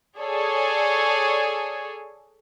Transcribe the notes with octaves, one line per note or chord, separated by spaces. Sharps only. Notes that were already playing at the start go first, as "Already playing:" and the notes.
G#4 A4 C#5 D5